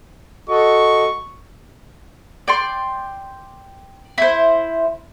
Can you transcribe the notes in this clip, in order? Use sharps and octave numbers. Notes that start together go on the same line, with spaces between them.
F#4 A4 D#5 C#6
D5 G5 C6
E4 C5